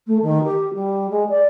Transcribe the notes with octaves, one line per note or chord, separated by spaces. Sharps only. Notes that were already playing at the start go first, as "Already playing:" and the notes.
A3
D#3
G4
G3
G#3
D5